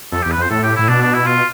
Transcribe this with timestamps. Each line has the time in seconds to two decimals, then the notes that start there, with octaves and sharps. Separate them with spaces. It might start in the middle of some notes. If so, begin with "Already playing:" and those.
0.12 F2 A4
0.22 E2 G4
0.31 B4
0.38 F2 C5
0.50 A2 A4
0.63 G4
0.76 A2 E4
0.88 B2 D4
1.02 D4
1.14 E4
1.26 F4